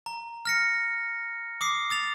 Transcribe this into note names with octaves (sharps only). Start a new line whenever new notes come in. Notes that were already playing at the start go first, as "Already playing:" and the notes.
A#5
F6 A#6 C#7
D6 D#6 C7
D#6 A6 F7